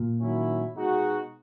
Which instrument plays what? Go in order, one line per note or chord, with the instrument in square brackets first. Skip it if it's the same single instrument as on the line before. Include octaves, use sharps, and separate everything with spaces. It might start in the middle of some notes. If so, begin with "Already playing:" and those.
Already playing: [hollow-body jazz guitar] A#2
[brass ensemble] D#3 F#3 C#4 E4
B2 G#3 D#4 F#4